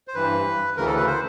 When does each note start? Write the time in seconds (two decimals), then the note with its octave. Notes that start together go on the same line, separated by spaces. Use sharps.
0.08 C5
0.14 G2 E3 B4
0.76 D2 C#3 E3 A#4
0.86 A4
0.96 B4
1.07 C5